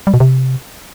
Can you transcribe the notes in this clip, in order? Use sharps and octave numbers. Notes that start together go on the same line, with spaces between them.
G3
B2
C3